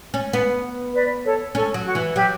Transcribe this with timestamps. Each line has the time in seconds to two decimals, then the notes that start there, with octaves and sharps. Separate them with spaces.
0.14 C#4
0.33 B3
0.94 B4 D5
1.24 A4 C#5
1.55 C#4 A4
1.74 F#3
1.85 F#4
1.95 E3
2.15 F#3 G4